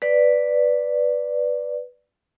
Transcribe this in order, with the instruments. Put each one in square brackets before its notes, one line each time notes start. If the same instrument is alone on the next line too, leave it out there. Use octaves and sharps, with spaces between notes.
[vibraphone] B4 D5